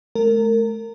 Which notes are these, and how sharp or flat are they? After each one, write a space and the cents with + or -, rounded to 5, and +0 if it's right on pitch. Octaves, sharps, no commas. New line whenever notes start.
A3 -35 A#4 -25